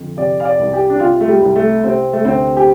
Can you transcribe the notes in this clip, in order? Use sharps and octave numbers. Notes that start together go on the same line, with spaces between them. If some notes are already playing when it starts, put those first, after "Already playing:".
Already playing: F2 D3
C3 D5
F5
D5
C2
G4
D4
C3 F4
A3
G3
C2
A3
C3 C4
A3
D2 C4
G4